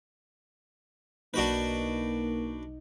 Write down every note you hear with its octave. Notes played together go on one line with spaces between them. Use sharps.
B1 A#3 D4 D#4 F#4 B4